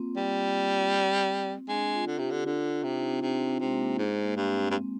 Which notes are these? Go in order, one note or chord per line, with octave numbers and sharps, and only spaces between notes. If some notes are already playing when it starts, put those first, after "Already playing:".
Already playing: A#3 C4 F4
G3
G#3 D4
F4
D3
C3 G4
D3
D3 F4
D4
C3
D#4
C4
C3 D4
C4
C3 G#3
A#3
G#2 G#3
A#3
G2
C4
G2
C4